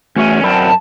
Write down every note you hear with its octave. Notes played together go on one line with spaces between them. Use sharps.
E2 A3 C#4 F#4 E5
F#2 C4 A#4 D5 A5 B5